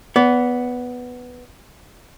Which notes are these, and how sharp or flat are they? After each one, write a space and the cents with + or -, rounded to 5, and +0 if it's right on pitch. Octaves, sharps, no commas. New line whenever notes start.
B3 +0 D5 -30